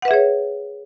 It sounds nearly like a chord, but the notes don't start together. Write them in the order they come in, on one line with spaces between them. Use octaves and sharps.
F#5 B4 E5 G#4 C#5